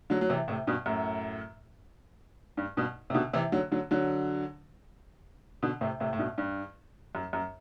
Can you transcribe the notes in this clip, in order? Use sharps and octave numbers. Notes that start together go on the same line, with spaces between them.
D3 F#3
F#3
C3 E3
A2 C3
G2 B2
F#2 A2
G2
G2 B2
C3
B2 D3
C3 E3
D3 F#3
D3 F#3
D3 F#3
B2 D3
A2 C3
A2 C3
A2
G2 B2
G2
F#2
F#2